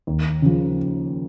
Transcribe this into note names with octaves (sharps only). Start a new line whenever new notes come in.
D#2
C#3 F3